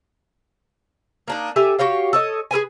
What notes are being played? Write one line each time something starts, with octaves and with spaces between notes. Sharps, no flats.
A#3 D4 D#4
G4 A4 E5 G#5
F#4 G4 C#5 F5
A4 C#5 D#5
G#4 A#4 B4 G#5